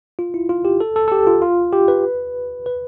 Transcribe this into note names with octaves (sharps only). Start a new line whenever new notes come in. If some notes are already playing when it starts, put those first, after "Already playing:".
F4
E4
F4
G4
A4
A4
A4
G4
F4
F4
G4
B4
B4